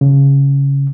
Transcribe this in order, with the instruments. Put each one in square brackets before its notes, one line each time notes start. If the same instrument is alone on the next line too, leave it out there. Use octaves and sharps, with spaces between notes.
[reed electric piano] C#3